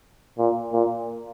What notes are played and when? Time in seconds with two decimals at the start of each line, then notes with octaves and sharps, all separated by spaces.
0.38 A#2
0.73 A#2